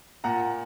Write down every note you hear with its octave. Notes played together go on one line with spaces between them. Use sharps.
A#2 F#5 A#5